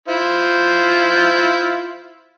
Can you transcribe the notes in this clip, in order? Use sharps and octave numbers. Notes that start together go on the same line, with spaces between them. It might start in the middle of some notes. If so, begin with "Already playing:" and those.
E4 F4 C5